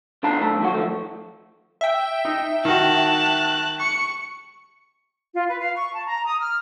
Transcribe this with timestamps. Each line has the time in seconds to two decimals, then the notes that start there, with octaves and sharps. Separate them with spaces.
0.23 D2 D3 D4 A5 A#5
0.40 B1 A3 A5
0.60 D#3 F#3 F#4
0.75 F3 A3
1.81 E5 G5
2.25 D#4
2.65 D#3 F#4 A5 F#6
3.80 C#6 C#7
5.34 F4
5.47 B4
5.60 F5
5.76 C#6
5.93 A5
6.06 A#5
6.25 D#6
6.40 F6